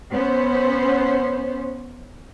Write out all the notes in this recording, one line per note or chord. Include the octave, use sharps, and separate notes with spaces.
B3 C#4 C5